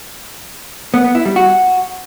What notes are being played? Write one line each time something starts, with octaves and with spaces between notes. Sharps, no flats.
B3
B3
E4
G3
F#4